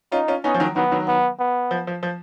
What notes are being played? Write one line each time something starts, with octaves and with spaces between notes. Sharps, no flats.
C#4 D#4 F4
C#4 F4
B3 C#4 D#4
F3
D#3 F#3
D#3 F#3 B3
D#3 F#3
B3
B3
F3
F3
F3